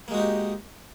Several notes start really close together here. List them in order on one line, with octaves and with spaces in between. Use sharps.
A#3 G#3 F#4 D#4 G4